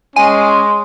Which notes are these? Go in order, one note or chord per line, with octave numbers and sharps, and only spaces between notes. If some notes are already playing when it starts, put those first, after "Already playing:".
G#3 C#4 G#5 C6 D#7